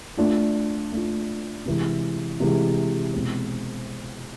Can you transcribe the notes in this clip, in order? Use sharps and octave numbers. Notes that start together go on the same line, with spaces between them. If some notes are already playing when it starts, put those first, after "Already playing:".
A3 D4 F4
A3 D4 F4
C3 E3 G#3
C3 E3 G#3
B2 G#3 C4